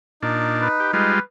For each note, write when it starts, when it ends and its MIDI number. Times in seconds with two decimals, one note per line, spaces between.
0.22 0.68 46
0.22 0.68 62
0.22 1.11 63
0.61 0.93 71
0.80 0.91 67
0.93 1.20 55
0.93 1.20 56
0.93 1.20 65
0.93 1.20 71